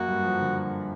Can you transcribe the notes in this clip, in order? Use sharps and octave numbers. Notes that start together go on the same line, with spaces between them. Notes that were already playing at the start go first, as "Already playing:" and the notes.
Already playing: F#2 A#3 F#4
G2
F3
D3